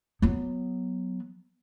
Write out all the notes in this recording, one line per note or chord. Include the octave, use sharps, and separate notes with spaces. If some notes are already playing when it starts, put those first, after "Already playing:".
F#3 B3